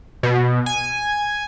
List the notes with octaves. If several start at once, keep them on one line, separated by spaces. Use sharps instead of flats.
B2
G#5